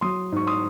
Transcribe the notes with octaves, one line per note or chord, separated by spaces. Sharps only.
F#3 C6 D#6
G#2 C#6
C6 D#6